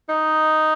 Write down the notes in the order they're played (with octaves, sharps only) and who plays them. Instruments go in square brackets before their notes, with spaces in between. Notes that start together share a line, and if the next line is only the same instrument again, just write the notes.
[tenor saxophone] D#4